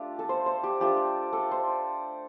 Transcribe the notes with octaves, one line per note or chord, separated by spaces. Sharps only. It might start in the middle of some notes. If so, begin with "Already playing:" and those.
Already playing: A3 D4 F4 G4
A4
C5
C5
G4
A3 D4 F4 G4
A4
C5